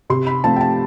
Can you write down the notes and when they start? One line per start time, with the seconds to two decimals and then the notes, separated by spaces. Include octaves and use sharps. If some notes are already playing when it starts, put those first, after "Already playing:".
0.10 C3 C6
0.27 B5
0.44 F3 A3 C4 A5
0.56 G5
0.61 A5